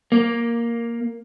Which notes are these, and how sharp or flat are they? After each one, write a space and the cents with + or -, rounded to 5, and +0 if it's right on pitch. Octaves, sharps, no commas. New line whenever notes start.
A#3 +0